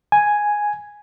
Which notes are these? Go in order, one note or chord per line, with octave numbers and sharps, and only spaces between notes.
G#5